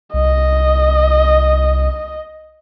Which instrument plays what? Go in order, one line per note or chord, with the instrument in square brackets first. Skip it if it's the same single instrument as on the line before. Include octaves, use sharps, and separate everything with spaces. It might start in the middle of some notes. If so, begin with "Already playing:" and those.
[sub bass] C2 [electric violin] D#5